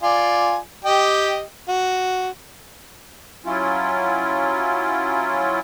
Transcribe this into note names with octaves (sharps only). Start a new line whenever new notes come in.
F4 D5 G#5
G4 D#5 G5
F#4
F#3 C#4 E4 F4